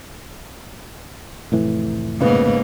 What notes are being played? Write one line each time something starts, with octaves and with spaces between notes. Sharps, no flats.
F1 A2 E3
G#2 C#3 A#3 B3